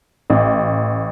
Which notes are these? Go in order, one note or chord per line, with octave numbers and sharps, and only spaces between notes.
A1